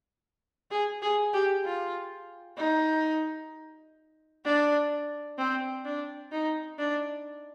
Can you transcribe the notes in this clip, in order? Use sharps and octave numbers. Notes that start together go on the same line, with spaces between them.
G#4
G#4
G4
F4
D#4
D4
C4
D4
D#4
D4